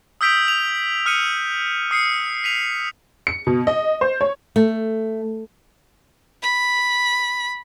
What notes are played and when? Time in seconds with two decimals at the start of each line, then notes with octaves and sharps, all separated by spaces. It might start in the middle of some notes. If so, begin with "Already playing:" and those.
0.21 D#6 E6 G6 B6 D7 F7
0.48 F7
1.06 D#6 F6 C#7 D#7 F7
1.91 D#6 C7 C#7
2.44 B6 D#7 F7
3.27 C#7
3.47 B2
3.67 D#5
4.01 C5
4.21 C#5
4.56 A3
6.42 B5